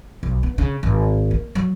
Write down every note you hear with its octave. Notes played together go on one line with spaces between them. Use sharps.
B1
B3
C#3
G#1
A#3
F#3